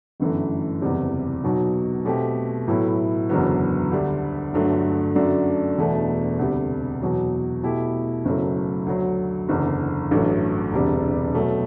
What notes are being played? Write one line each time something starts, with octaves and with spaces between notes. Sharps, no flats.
G1 F#2 E3 A3
F#1 E2 C3 G3
B1 B2 F#3
B2 A3 C4 G4
A2 F#3 B3 E4
F#1 E2 D3 F#3 B3
D2 D3 G3
G1 G2 D3 F#3 A3
F#2 D3 A3 D4 F#4
E1 E2 B2 A3 D4
D2 C3 G3
E2 B2 F#3
B2 A3 E4 G4
F#1 F#2 F#3 A3
D2 D3 F#3
F#1 E2 D3
A1 G2 F#3 A3
E1 D2 C3 G3 D4
B2 F#3 A3